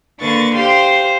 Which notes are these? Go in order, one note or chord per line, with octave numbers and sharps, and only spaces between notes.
D3 A#3 B4 C#6 A6
G4 C5 F5 C6